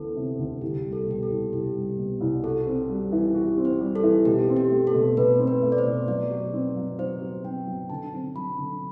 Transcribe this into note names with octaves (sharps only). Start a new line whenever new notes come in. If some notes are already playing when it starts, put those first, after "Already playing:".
Already playing: D2 E3 B3 A4
C3
D2
C2 G4
G3
A4
B2 G4
A4
C2
C2 G4
G3
B2
C2
F#4 A4
C4
G3
E3
F#4
C4
C5
G3
A4
E3
B2 G4
C4
G4
A3
A4
B2
B2 B4
C4
B4
A3
D5
C5
B2
F#3 D5
F#4
C4
F#3
F#3 C5
F#4
C4 G5
F#3
D3 A5
C4
F#3 B5
D3